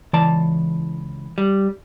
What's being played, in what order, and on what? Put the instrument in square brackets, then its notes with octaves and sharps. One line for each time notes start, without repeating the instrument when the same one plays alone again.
[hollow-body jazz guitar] C#2 D5 A5 [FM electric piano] E3
[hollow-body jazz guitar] G3